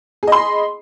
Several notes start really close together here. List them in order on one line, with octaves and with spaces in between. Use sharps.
G#4 D#5 C6 B5